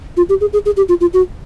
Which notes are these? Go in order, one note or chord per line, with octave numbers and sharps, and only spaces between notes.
F4
G4
G#4
G#4
G#4
G4
F4
F4
F#4